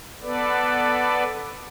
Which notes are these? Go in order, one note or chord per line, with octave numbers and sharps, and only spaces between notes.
B3 A4 B4 D5